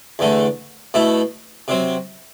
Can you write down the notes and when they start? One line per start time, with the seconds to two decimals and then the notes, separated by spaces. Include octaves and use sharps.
0.19 E2 D3 A3
0.94 B2 A3 E4
1.68 C3 F#3 C4